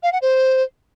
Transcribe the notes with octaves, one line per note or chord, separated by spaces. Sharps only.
F5
F#5
C5